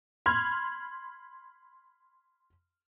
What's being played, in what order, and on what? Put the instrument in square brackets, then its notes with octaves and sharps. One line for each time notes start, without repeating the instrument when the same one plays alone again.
[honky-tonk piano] B5 C6 F6 G#6